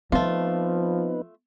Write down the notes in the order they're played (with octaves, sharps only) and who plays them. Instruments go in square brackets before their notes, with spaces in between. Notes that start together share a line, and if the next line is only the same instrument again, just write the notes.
[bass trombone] F3 [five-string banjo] A3 F4 [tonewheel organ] B3 D#4 B4 [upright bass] C4